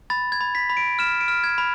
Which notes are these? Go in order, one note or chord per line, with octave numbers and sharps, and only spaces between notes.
B5 A6
G#6
B5
B6
B5
D7
F6 E7
D7
F6
G#6
B5